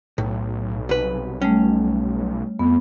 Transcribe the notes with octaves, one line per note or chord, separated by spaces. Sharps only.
B1 A2
C2 B4
G3 A3 C#4
F2 B3